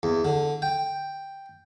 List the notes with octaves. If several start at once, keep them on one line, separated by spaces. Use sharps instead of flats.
E2
D3
G5